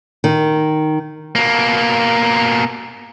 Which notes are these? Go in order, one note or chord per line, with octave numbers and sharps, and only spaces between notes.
D#3
B2 A#3